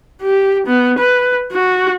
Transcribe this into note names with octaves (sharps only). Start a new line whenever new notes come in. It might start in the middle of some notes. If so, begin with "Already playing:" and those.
G4
B3
B4
F#4